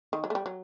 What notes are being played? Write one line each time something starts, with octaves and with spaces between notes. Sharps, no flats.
D#3
F#3
A3
G3
F#3